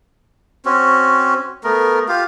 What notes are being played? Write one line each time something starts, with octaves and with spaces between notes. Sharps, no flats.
C4 C#4 F#4
A3 B3 A#4
F4 G4 F5